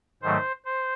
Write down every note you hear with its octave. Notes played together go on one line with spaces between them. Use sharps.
G#2 D#3 F#3 A3 C5
C5